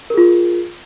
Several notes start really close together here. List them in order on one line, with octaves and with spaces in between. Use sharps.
A#4 G#4 F4